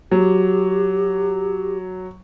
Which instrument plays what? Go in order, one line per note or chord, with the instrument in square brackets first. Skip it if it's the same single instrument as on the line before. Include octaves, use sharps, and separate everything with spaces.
[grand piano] F#3 [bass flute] G4